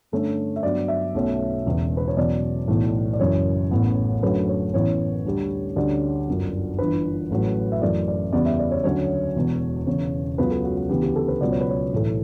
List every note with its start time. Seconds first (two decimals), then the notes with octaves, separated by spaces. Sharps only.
0.12 G2 D3 A3 C#4
0.56 E5
0.63 G2 F#3 B3 D5
0.88 E5
1.14 B1 B2 A3 C#4
1.66 E1 E2 C#3 E3
1.97 B4
2.08 C#5
2.17 E2 B2 F#3 C#4 D5
2.68 B1 A2 E3 B3
3.13 D5
3.20 F#1 F#2 E3 C#5
3.71 A1 A2 E3 B3
4.23 F#2 D3 F#3 A3 C#4 B4
4.48 C#5
4.74 A1 A2 E3 B3 C#5
5.25 D2 D3 G3
5.76 D2 D3 G3 C#4 D5
6.28 G1 F#2 D3
6.79 G1 G2 E3 B4
7.30 A1 A2 F#3
7.72 E5
7.82 F#2 E3 A3 D5
8.08 D5
8.33 E2 C#3 G3 B3 D5
8.46 E5
8.59 D5
8.71 C#5
8.84 D2 D3 F#3 C#4 C#5
9.36 E1 E2 B2
9.87 E1 E2 C#3 C#5
10.38 C#2 C#3 F#3 B3 B4
10.51 A4
10.64 F#4
10.77 F#4
10.89 D2 C#3 E3 B3 G4
11.02 G4
11.16 A4
11.28 B4
11.41 C#2 B2 F#3 B3 D5
11.51 C#5
11.60 B4
11.69 C#5
11.92 B1 A2 E3 A3